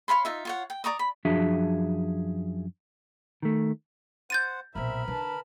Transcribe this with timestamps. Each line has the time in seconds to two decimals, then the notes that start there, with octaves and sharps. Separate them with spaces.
0.08 C#5 F5 B5 C6
0.25 D#4 F4 E5
0.45 F4 C#5 F#5
0.70 G5
0.84 D5 A#5 C#6 D#6
0.99 B5
1.25 F#2 F3 D4 F#4 G#4 E5
3.42 D#3 A3
4.30 C5 F#5 G6 A6 D#7
4.75 B1 A#2 C4 A#4 E5 B5
5.08 D3 B4 A5